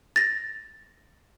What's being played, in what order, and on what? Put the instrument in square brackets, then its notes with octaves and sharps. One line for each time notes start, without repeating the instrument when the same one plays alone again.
[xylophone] A6 A#6